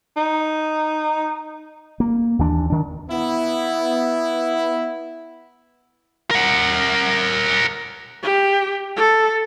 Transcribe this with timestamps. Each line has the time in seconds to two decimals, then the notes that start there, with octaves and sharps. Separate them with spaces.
0.17 D#4
2.00 A#3
2.39 D#2 E3 D4
2.70 D#3 D4
3.09 B3 E4
6.31 A#4 F#5
8.23 G4
8.96 A4